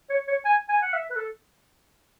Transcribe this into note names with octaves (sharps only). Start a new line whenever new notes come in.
C#5
C#5
G#5
G#5
F#5
E5
B4
A4